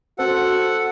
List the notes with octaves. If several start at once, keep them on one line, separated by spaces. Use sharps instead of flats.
C4 F#4 A4 F#5